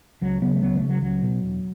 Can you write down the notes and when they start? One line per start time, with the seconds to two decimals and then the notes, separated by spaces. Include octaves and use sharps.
0.21 C#2 F#3
0.42 C#3 F#3 B3
0.56 A3
0.62 C#2 F#3 B3
0.76 E3 A3
0.82 C#3
0.89 F#3
1.02 C#2 F#3
1.22 B2
1.42 E1